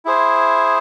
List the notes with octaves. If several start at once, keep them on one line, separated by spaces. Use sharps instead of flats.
E4 G#4 C5